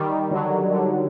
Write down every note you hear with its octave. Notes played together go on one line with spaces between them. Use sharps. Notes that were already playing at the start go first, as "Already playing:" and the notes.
Already playing: D#3 G3
D3 F#3
D3